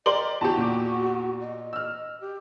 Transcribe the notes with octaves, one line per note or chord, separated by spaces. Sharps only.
G4 A#4 D5 D#5 C6 F#7 G7
E2 F#4 G4 A5
A#2 D6
D#5
E6 F6
G4